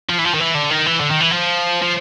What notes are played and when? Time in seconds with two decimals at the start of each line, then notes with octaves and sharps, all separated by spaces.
0.09 F3
0.18 E3
0.25 F3
0.34 D#3
0.40 E3
0.55 D3
0.70 D#3
0.86 E3
1.00 D3
1.10 D#3
1.21 E3
1.32 F3
1.82 F3